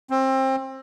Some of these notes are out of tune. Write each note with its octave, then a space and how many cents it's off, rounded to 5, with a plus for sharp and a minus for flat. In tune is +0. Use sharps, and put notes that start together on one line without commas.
C4 +25